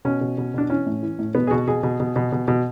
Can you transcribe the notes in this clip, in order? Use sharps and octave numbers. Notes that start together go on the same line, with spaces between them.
B2 C#4
B2
B2
B2 D4
E3 C#4
A2
E3
A2
B2 B3
G#4
B2 F#4
B2 G#4
B2
B2
B2
B2
B2